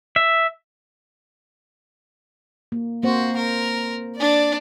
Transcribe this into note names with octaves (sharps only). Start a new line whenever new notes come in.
E5
A#3
A#3 C4 F#4 C5
A#4
D4 D5